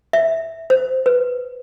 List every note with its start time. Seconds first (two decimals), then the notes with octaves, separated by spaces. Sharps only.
0.13 E5
0.70 C5
1.06 B4